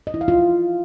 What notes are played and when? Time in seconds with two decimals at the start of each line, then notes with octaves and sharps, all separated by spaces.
0.07 D#5
0.14 E4
0.21 F5
0.28 F4